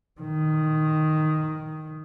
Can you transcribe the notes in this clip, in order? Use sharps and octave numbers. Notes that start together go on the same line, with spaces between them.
D#3